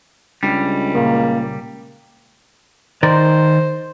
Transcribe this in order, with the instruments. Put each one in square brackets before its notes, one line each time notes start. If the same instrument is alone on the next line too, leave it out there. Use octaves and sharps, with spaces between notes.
[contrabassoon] C#2 [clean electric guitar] G3 [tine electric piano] G#3 D4
[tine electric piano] A#2 C#3 [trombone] A#3
[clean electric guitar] D#3 A#4 D5 [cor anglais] C5